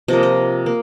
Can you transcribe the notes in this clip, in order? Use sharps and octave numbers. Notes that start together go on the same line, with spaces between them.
C3 F3 A#3 D#5
D#5
A#3